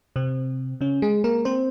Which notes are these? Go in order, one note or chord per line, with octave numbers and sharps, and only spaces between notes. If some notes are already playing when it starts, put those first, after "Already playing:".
C3 C4
C#3 C#4
G#3 G#4
A#3 A#4
C4 C5